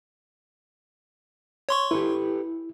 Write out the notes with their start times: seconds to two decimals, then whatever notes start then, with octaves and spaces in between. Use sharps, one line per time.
1.69 C#5 C6 C#6
1.91 E4 G4 A4 B4